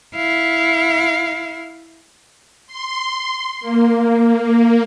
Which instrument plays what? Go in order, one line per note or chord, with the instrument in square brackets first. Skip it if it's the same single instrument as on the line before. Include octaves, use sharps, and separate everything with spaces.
[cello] E4 F5
[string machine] C6
A#3